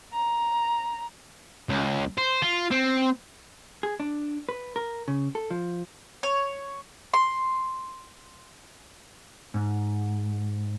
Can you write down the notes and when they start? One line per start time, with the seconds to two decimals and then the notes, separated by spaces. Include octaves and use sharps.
0.13 A#5
1.69 C#2
2.18 C5
2.42 F4
2.71 C4
3.83 G#4
4.00 D4
4.49 B4
4.76 A#4
5.08 C#3
5.35 A4
5.51 F3
6.23 C#5
7.14 C6
9.54 G#2